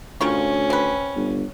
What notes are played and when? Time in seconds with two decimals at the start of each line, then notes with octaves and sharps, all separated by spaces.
0.21 D2 D#3 C#4 F4 C#5
0.70 C4 B4
1.16 G1